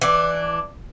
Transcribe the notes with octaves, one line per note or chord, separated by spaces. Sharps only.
E3 D4